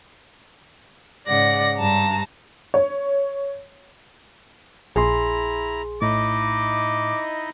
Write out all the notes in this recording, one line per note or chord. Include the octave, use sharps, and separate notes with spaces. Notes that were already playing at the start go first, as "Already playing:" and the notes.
G#2 C#3 D5 F#5 A#6
G2 A5 A#5
C#5
A#1 E4 G#4 A#5 C6
A2 D#4 E4 D#5 D6